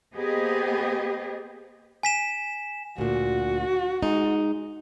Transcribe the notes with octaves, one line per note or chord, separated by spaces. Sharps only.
A#3 B3 G4 G#4 C5 D#5
G#5 B6 E7
D2 A#2 F#4
G#3 D#4